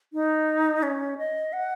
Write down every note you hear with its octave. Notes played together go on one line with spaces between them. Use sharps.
D#4
C#4
D#5
F#5